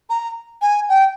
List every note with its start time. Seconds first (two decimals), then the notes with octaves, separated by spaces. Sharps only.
0.10 A#5
0.62 G#5
0.89 G5